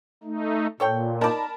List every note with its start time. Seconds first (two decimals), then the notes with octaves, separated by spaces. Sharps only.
0.24 A3 D#4
0.80 A#2 A4 C#5 G5
1.21 D#4 A#4 D5 A5 B5